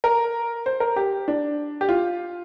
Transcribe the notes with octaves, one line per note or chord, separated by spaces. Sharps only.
A#4
C5
A#4
G4
D4
G4
F4